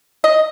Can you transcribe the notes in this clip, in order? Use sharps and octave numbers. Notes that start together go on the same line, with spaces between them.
D#5